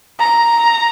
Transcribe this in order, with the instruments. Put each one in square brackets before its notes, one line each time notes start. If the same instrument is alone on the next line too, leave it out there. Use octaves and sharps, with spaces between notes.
[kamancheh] A#5